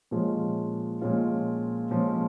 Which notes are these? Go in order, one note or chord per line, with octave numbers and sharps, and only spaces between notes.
A#2 F3 G#3 C#4 F4
A#2 F3 G#3 C#4 F4
A#2 F3 G#3 C#4 F4